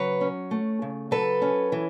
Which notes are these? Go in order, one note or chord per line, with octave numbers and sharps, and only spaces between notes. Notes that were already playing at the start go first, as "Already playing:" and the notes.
Already playing: C#3 F#3 B4 C#5
C#4
A3
C#3
F#3 A4 B4
C#4
E3